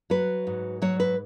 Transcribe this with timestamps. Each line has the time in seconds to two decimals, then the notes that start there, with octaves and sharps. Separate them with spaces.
0.10 F#3 B4
0.47 G#2
0.82 F#3 C#5
1.00 B4